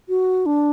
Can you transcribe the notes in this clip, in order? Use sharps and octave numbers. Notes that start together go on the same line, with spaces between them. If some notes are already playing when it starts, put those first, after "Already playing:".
F#4
D4